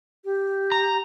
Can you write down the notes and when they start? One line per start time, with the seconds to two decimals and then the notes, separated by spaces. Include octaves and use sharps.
0.25 G4
0.72 A#5